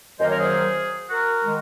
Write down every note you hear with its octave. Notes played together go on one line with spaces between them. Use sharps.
F#2 D#3 F#3 A#3 C5 D#5
A#4 C#5
G#4 C5
F#4 A#4
D#3 G#3